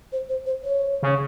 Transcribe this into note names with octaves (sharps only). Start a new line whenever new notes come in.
C5
C5
C5
C#5
C#3